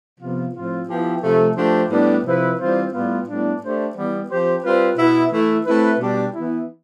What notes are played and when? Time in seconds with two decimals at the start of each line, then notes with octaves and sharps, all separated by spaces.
0.20 C3 F3 B3 F4
0.54 A2 F3 C4 F4
0.88 F3 B3 E4 G4
1.22 C3 F3 A3
1.57 F3 A3 D4 G4 C5
1.90 A2 G3 B3 D4
2.25 C3 F3 C4 E4 B4
2.58 E3 G3 C4 F4 C5
2.93 A2 G3 B3 F4
3.27 A2 G3 B3 D4
3.61 A3 D4 G4 C5
3.95 E3 G3 B3
4.29 F3 C4 G4 C5
4.63 G3 C4 F4 B4
4.97 B2 B3 E4
5.31 E3 A3 E4
5.65 A3 C4 E4 B4
5.99 B2 G3 D4 G4
6.33 E3 B3 E4